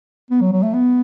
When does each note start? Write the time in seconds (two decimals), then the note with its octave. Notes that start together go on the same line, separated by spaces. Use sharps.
0.31 B3
0.41 F#3
0.52 F#3
0.63 A3
0.74 B3